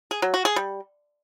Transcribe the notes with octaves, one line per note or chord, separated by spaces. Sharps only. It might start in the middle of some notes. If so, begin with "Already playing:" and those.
G#4
F#3
F#4
G#4
G3